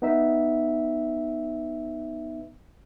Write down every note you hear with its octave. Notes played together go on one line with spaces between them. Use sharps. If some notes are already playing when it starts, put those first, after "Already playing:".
B3 D#4 E5